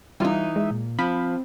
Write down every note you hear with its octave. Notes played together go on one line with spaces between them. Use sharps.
E3 G3 D#4 F4
G#3 E5
A#2
F3 C4 B5